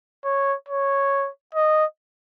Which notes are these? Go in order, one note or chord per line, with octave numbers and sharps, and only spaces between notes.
C#5
C#5
D#5